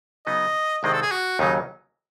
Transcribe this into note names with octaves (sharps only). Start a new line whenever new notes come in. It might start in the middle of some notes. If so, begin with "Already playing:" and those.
C#3 F#3 B3 D#4 D#5
C2 C3 D#3 G#3 C4 D#5
A4
G#4
F#4
D#2 C#3 F#3 D#4